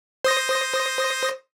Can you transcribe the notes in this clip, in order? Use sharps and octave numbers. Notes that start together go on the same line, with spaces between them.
C5 D#6 A#6